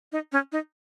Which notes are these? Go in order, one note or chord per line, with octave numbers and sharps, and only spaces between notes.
D#4
C#4
D#4